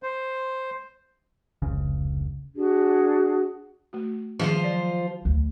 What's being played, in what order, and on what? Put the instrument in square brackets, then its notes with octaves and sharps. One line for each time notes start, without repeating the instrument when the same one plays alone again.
[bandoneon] C5
[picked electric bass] F1 C#2 C#3
[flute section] D4 F#4 G#4
[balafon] A3 F#4
[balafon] D#3 G3 G#4 [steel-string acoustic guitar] F3 F4 C5
[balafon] F#3 D5
[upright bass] D2